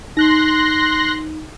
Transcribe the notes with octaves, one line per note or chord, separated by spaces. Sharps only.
D#4 C6 F#6 A#6